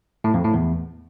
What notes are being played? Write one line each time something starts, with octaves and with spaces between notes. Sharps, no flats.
A2
F2
A2
E2